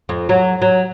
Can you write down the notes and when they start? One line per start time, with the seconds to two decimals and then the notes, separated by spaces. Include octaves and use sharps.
0.09 F2
0.29 F#3
0.62 F#3